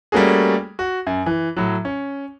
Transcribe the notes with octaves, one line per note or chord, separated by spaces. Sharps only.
G3 A3 A#3 C#4 F#4 G#4
F#4
F#2
E3
A2 F#3
C#4